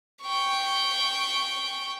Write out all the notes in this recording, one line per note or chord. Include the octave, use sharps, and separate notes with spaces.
G5 C#6